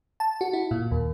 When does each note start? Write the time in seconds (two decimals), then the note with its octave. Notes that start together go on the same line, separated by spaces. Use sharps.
0.20 A5
0.41 F#4
0.53 E4
0.71 A#2
0.91 D#2